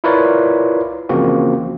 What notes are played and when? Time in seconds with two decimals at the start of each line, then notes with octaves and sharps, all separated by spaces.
0.04 E4 F4 A#4 B4 C#5 D5
1.09 C#3 E3 F3 A#3 C4 F#4